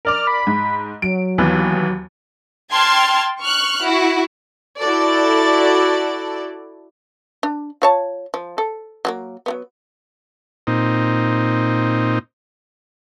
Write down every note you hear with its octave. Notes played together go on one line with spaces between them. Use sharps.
A#4 D5 D6 F6
B5
G#2
F#3 D7
D#2 E3 B3
G5 A5 C6 F6 G#6
C#6 F6 F#6
E4 F#4
E4 F#4 A4 D5
D4
F4 C#5 A5
F3
A4
F#3 G#3 A#3
F#3 A3 B3
A#2 C4 D#4